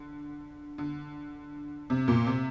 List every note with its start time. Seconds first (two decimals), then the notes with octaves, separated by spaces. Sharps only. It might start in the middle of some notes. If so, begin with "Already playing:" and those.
Already playing: D3
0.78 D3
1.90 C3
2.08 A#2
2.27 C3